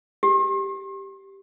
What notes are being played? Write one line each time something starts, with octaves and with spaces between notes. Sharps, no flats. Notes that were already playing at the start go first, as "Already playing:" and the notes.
G4